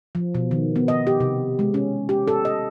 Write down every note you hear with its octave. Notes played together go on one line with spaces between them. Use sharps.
F3
B2
D#3
B3
D#5
G4
C3
G#3
C#4
G4
A4
D#5